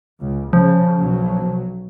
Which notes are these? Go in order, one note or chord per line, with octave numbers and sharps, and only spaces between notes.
C#2
C#3 F3
B1 F#3